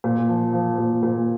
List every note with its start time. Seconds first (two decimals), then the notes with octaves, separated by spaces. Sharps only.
0.04 A#2
0.29 F3
0.53 F3
0.78 A#2
1.03 A#2